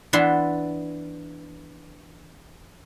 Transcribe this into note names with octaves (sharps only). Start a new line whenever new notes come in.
E3 B3 D4 E5 C6